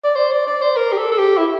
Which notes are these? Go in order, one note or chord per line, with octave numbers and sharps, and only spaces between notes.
D5
C5
D5
D5
C5
A#4
G4
A4
A4
G4
E4